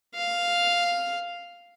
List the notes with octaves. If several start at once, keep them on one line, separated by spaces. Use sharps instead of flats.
F5